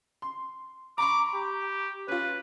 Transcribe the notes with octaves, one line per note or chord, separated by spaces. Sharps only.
C6
A#5 B5 C#6 D6
G4
C#4 F4 B4